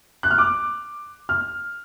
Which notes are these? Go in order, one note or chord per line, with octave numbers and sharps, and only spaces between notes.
F#6
F6
D6
F6